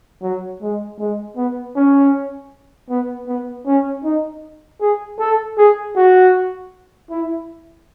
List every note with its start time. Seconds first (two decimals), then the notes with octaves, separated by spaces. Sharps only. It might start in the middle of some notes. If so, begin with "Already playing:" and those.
0.22 F#3
0.61 G#3
0.98 G#3
1.37 B3
1.76 C#4
2.89 B3
3.27 B3
3.66 C#4
4.04 D#4
4.80 G#4
5.19 A4
5.58 G#4
5.96 F#4
7.10 E4